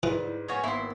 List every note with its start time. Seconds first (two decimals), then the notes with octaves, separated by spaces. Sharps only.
0.03 G#2 E3 F3 G3 E4 B4
0.48 F3 B3 C#4 F#4 C#5
0.64 G#1 A#3 B3 E4 C6